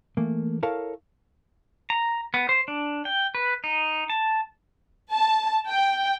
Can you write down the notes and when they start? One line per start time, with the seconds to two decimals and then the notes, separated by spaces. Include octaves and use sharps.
0.17 E3 A3 A#3
0.63 E4 A4 A#4 C#5 F5 A5
1.90 A#5
2.34 B3
2.49 C5
2.68 D4
3.05 G5
3.35 B4
3.64 D#4
4.10 A5
5.12 A5
5.69 G5